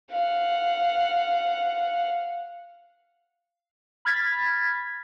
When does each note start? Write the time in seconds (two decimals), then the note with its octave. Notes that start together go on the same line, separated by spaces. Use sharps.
0.11 F5 F#5
4.05 B5 F6 G#6 A6 B6